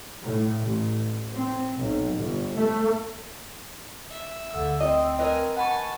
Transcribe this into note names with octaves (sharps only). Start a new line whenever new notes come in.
A2
A1
C4
B1
G1
A3
E5
D2 D3 E6
C4 D#5
A#4 B4 D#5 G#5
F#5 G#5 A5 B5 C#6